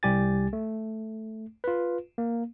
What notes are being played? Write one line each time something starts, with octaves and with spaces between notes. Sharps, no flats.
C2 G3 G4 G#5 A6
A3
F4 B4
A#3